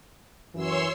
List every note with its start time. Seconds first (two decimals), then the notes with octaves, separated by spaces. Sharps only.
0.55 F#2 E3 C#5 C6 E6